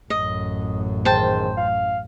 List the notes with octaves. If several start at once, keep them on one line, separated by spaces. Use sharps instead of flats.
A1 F#2 D#5
G#2 D#3 C5 G5 A5
F5